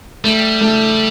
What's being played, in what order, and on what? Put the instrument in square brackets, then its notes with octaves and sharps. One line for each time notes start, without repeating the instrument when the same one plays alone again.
[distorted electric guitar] G3 [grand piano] A3
[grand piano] A3